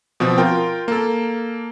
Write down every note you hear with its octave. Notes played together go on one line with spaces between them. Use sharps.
B2 F3 C4
F4 A#4 G5
A#3 A4